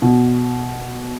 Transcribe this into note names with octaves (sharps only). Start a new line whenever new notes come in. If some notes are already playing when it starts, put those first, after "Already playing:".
B2